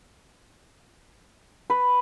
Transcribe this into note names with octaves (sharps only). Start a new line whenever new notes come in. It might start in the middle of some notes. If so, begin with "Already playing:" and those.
B4